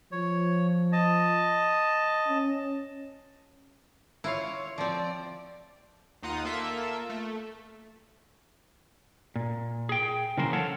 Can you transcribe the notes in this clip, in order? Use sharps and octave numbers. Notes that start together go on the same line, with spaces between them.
F3 C#5
D#5 A5
C#4
E4 F4 C#5 F5
F3 C4 D5
D#2 D#4 F4 F#5 D#6
A#3 F4 A4 E5
A3
A#2
G#4 G5
C#3 E3 F#3 A#3 A#4 C5
A4 C#5 F5 F#5 A5